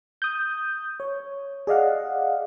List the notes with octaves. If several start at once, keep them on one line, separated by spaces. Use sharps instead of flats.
D#6 G6
C#5
G#4 D5 D#5 F5 F#5